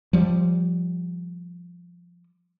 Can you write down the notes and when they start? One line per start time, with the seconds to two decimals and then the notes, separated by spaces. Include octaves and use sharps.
0.13 F3 G3